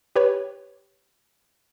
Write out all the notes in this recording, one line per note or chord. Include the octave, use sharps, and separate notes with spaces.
G4 B4 C#5